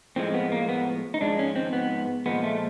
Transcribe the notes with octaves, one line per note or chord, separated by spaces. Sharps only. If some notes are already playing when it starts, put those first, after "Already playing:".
A2 F3 G#3 C4
B3
A#3
B3
D#4
G#2 F3 G#3 D4
C#4
C4
B3
A#2 F3 G#3 B3
A3